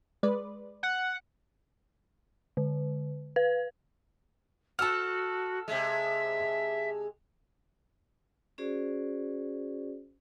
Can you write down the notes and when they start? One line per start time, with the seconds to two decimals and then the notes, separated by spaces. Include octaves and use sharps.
0.23 G#3 B4 D5
0.83 F#5
2.57 D3
3.36 B4
4.79 F#4 A4 F#5 A5 E6 F6
5.68 C3 G#3 E5
8.58 C#4 F#4 G#4 C5 D5